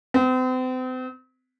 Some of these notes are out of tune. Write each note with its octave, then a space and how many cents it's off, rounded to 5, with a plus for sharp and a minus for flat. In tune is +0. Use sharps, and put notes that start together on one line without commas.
C4 -40